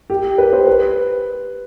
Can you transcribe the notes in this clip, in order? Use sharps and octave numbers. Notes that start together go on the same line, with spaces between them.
G4
B4
C5
B4